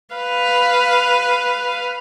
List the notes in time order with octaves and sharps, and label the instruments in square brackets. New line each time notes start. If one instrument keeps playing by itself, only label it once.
[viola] B4 F5